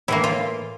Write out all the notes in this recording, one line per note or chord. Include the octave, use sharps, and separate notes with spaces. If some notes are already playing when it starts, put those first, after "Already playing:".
A2 E3 A#3 E4
F4